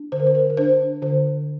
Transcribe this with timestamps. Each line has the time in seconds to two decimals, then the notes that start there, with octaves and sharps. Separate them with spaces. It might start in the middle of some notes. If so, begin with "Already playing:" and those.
Already playing: D4
0.12 D3 C5
0.20 A#4
0.27 C5
0.35 A#4
0.50 A#4
0.57 D4 C5
1.02 D3 C5